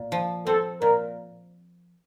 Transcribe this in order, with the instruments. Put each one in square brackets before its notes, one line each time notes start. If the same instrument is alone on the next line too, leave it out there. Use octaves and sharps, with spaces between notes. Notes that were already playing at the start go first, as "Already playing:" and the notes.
Already playing: [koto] A#2
F3
[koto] C4 [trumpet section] A4
[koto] A#2 [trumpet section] A#4